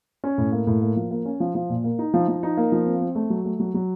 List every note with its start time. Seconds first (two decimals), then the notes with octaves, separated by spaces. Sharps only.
0.24 C#4
0.38 A2
0.52 A#3
0.67 A2
0.82 A#3
0.96 F3
1.11 A#3
1.25 C#4
1.40 F3
1.55 F3
1.69 A#2
1.84 A#3
1.99 D#4
2.14 F3
2.28 F3
2.43 D#4
2.57 A#3
2.72 F3
2.86 C4
3.02 C4
3.15 A3
3.30 F#3
3.45 A3
3.60 F#3
3.74 F#3